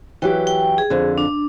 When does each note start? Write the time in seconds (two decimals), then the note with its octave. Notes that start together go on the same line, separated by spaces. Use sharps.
0.22 E3 F#3 G4 G5
0.47 G5
0.78 G#4
0.90 F2 D3
1.18 D4